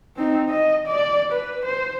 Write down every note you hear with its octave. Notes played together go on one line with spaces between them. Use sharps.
C4 D#4
D#5
D5
B4
C5